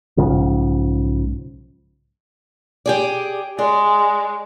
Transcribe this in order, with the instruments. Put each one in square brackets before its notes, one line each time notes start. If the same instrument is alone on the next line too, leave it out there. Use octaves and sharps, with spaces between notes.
[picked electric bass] B1 G#2 C#3 F3
[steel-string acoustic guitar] G4 G#4 D5
[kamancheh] G#3 [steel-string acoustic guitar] D5 D#5